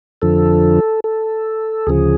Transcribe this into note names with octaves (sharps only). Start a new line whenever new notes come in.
F2 D3 F3 A4
A4
D2 C#3 F3 G#4